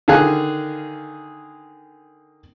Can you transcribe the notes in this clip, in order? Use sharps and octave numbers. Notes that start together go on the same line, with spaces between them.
D3 D#3 G#4 F5 G#5 F#6